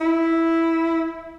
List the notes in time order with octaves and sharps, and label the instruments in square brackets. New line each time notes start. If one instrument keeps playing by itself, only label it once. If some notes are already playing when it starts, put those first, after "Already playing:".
[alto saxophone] E4